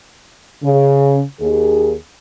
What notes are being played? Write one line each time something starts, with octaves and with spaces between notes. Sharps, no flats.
C#3
D#2 G#4